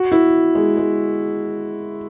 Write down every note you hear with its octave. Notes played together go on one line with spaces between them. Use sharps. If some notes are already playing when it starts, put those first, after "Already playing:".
Already playing: F#4
E4
G#3
G#3